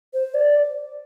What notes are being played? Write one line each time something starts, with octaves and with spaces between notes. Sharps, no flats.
C5
D5